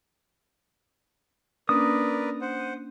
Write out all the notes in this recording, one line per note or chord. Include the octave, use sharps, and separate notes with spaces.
A#3 C#4 D4 A#4 B4 D5 D#6
C5 F#5